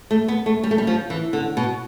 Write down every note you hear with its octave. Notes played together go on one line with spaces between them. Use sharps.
A3
B3
A3
G3
A3
G3
F3
E3
D3
B2